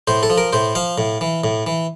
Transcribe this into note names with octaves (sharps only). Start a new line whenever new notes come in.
A2 C5
A4
F3
A#4
A2 C5
F3 F5
A2
E3
A2
E3